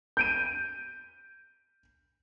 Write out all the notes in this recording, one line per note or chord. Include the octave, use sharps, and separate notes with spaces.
G6 D7 D#7